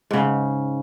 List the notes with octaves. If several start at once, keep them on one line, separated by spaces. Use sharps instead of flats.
G#2 C#3